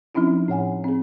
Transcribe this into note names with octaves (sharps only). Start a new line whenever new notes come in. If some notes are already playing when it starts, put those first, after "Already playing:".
F3 C4 C#4 D#4 E4
A2 C#5 F#5 G#5
C4 G#4